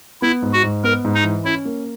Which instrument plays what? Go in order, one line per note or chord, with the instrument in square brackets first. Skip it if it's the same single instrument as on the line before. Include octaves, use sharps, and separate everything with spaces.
[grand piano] B3 [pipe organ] E4
[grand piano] G#2
[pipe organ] F#4
[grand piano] G#2
[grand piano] B3 [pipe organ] A#4
[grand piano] G#2
[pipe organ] D#4
[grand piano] E3
[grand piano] C#4 [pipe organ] E4
[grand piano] A#3